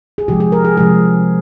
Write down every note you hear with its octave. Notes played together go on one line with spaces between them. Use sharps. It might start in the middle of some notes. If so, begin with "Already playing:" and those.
G#4
C3 F3 G#3 G4
G#4
A#4
G#4
C3 F3 G#3 G#4